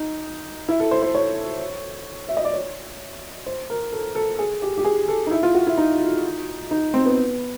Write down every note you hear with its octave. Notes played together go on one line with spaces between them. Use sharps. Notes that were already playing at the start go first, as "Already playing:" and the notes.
Already playing: D#4
E4
A4
C5
C5
C#5
E5
D#5
D5
C#5
C5
A#4
A4
A4
G#4
G4
G4
G#4
A4
D#4
E4
F4
F#4
E4
D#4
D#4
C4
B3